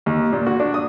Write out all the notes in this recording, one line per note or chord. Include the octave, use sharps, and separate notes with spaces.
D#2
A#2
F#4
D4
D#6